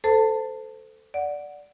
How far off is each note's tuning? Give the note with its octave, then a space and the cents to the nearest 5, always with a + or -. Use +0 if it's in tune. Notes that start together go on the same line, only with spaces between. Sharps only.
A4 +0 C5 -25 A5 +20
D5 -5 F#5 -5